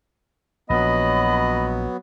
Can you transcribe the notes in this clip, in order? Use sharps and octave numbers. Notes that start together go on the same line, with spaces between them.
A#1 F#3 B3 D#5 B5